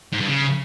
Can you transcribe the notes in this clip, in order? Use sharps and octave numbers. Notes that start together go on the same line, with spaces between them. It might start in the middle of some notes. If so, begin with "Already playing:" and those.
G#2
G2
C#3